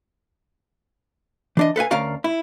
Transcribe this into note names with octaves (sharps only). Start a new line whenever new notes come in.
E3 D4 D#5
A4 B4 F5 G#5
D2 C#4 A#4 D5 F5 A#5
E4